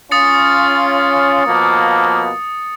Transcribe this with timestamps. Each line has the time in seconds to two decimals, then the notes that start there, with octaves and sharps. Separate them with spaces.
0.11 C#4 F4 D#6 A6 C#7
1.47 B2 F3 A#3